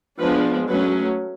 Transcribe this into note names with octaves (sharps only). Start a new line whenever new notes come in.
F3 G#3 B3 D4 B4
F#3 A3 C#4 B4